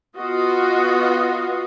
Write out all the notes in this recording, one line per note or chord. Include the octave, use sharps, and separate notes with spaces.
B3 F4 F#4 D#5